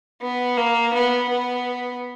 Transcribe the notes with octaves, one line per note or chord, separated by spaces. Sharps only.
B3
A#3
B3
B3